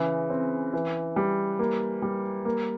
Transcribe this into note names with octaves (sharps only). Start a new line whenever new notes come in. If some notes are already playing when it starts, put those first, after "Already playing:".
Already playing: C#3 E3
C4
E3
G3
A#3
G3
A#3